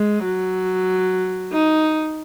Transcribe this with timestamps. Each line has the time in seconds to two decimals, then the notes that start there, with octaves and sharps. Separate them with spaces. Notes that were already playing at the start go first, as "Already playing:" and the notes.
Already playing: G#3
0.24 F#3
1.52 D#4